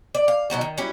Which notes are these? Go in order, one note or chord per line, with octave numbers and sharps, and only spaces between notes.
D5
F5
B2 F#3 D#4 F#4
D#3
F#3 G3 C#4 E4